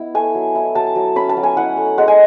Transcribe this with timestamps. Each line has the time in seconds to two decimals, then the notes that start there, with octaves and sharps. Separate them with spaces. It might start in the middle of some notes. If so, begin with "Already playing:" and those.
Already playing: B3 E4
0.15 A3 G#5
0.35 F#3
0.55 E4
0.75 F#3 A5
0.95 F#3
1.16 C#4 B5
1.29 A5
1.37 F#3
1.43 G#5
1.57 E4 F#5
1.77 A3
1.98 G#3 F#5
2.08 G#5